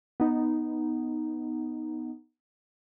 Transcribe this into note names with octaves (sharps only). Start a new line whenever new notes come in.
B3 D#4